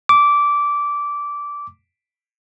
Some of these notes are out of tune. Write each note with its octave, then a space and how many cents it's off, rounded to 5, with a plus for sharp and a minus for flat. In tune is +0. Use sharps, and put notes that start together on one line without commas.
D6 -15